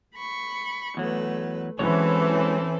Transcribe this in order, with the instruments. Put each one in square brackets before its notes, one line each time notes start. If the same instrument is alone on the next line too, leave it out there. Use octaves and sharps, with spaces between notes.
[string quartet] B5 C#6
[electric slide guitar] E2 F#3 [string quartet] A3 B4
[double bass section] E3 [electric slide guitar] F#3 G#3 C#5 [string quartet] C4 C#4 A4